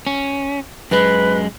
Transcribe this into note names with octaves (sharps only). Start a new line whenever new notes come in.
C#4
F#2 G#3 B4